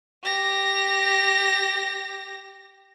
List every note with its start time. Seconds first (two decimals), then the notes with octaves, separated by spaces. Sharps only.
0.24 G4 A#6